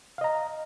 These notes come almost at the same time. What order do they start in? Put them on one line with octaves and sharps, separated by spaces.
F5 D#5 A#5